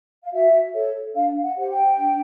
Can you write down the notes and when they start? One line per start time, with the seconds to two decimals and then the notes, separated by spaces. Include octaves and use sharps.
0.24 F5
0.33 F#4 E5
0.74 A4 C#5
1.15 D4 F5
1.43 F#5
1.57 G4 C5 F#5
1.70 G5
1.98 D4